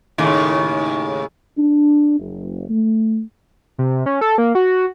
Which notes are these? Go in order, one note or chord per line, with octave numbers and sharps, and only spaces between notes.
D#2 A2 C#3
D4
F#1
A3
C3
C#4
A4
A#3
F#4